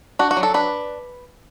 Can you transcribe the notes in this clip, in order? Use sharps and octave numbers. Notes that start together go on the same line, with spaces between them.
D4 F#4
F#4
F#3
A4
D4 B4